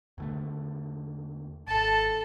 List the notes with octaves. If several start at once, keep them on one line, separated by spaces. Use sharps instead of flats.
E2 D3 A3
G#1 A4 A5